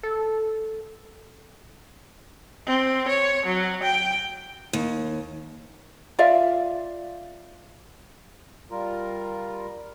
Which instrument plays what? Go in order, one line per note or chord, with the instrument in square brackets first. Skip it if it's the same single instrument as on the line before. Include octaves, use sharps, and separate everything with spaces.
[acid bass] A4
[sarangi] C4
C#5
F#3
G5
[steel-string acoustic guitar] D#2
[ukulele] F4 D5 E5 F5
[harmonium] G3 F4 A#4